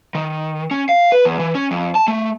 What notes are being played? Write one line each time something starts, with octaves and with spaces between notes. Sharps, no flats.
D#3
C#4
F5
B4
E2
E3
C#4
F2
A5
A3